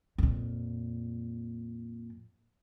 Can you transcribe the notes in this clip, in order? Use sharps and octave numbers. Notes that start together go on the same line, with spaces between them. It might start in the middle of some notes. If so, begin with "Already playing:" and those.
F2 A#2